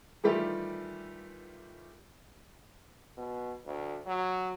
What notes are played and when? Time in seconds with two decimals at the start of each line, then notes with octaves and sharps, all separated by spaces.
0.24 D#3 E3 G3 A3 F4 G4
3.17 B2
3.65 D2
4.06 F#3